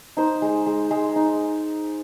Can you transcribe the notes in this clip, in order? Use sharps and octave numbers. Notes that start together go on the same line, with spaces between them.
D#4 C5
G#3
G#3
G#3
D#4